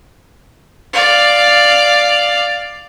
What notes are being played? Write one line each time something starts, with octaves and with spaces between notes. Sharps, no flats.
D5 F5